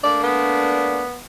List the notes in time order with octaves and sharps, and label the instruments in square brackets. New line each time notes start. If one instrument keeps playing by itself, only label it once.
[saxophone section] A3 A#3 D4 [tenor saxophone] D5
[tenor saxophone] B3